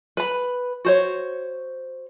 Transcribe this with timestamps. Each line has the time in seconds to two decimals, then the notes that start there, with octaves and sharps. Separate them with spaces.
0.17 B4 B5
0.85 F#4 C5 C#5